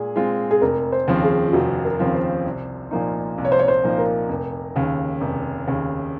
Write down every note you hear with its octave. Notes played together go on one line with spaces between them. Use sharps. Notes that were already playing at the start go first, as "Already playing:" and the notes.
Already playing: A#2 G#3 G#4
G#3 C4 F4
G#4
F1 A#4
C5
D#2 C#3 F3 C4
G#4
F4
F1 F#4
A#4
D#2 C#3 F3 C4
C5
C2
A#2 F3 A#3 D#4
C2
C#5
C5
C#5
C5
A#2 F3 A#3 D#4
A#4
F1
D#2 C#3
F1
D#2 C#3